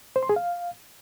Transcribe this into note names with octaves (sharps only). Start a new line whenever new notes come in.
C5
C6
G#4
F5